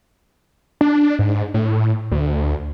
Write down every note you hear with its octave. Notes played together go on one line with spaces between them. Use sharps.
D4
G#2
A2
D2